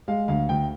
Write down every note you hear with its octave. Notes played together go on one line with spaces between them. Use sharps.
G#3 F5
D2 F5
D2 G5